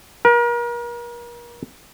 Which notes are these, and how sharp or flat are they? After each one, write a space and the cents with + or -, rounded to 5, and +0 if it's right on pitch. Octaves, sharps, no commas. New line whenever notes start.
A#4 +35